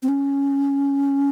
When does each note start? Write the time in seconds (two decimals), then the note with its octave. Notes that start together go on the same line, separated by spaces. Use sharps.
0.03 C4
0.08 C#4